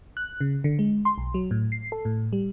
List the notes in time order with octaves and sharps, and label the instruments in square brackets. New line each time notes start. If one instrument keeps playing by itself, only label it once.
[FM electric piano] F#6
C#3
D3
G#3
C6
B1
F#3
A2
C7
A4
A2
G3